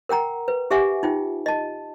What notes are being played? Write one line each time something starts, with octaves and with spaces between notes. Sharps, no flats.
A#4 F#5 G5 A#5
B4
G4 G#4 E5 F#5 G#5
D#4 F4 G5
D#5 A5